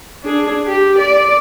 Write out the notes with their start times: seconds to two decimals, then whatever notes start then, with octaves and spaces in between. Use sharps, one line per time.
0.23 D4 G#4
0.67 G4
0.98 D5